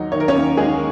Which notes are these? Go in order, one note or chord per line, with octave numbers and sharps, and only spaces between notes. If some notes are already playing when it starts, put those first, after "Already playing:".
Already playing: D#2 F#3 D#4
D#3 C#5
A#4
C#4 C#5
D#2
D#2 G#3 G#4